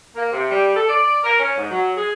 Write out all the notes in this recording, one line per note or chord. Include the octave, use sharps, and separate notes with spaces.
A#3
C3
G3
A4
D5
A#4
C#4
G#2
F#3
G#4